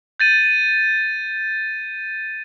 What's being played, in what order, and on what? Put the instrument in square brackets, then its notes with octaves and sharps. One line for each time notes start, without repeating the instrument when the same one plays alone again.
[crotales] G6 A6 D#7